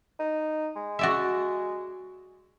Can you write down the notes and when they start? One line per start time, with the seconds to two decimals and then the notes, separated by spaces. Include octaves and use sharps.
0.19 D#4
0.76 G#3
0.99 F#4 D5 E5